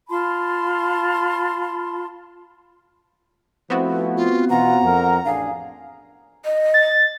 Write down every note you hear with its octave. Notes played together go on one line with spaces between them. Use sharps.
F4 A5 B5 C6
F3 A3 B3 C4 E4 F#4
F4
B2 E3 F4 F#5 A#5
F2 A#4
A1 D4 G#4 F5
D#5
A6